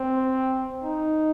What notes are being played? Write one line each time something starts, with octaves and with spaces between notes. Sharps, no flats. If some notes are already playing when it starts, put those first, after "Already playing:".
Already playing: C4
D#4